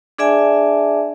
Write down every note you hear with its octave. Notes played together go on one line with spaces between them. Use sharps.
D4 G#4 D5 E5 G#5 A5